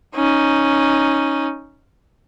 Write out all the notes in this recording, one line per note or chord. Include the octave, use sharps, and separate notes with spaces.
C#4 D#4